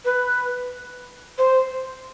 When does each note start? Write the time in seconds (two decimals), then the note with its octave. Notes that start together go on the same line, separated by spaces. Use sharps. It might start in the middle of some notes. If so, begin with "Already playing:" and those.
0.05 B4
1.38 C5